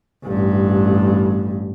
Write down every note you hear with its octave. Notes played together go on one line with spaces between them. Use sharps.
A1 G2